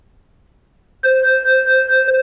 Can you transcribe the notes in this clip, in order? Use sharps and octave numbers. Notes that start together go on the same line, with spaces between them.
C5